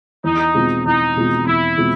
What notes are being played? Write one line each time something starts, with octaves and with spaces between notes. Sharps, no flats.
E2 D#4
B2 G#3 C4 F4
E2 D#4
B2 G#3 C4 F4
E2 E4
B2 G#3 C4 F4